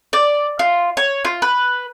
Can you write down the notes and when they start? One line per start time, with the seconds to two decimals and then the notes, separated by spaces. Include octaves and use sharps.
0.13 D5
0.59 F4
0.97 C#5
1.25 F4
1.42 B4